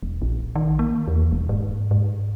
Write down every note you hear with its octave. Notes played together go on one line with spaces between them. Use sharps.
E1
A#1
D#3
A#3
E2
E1
G#2
G#2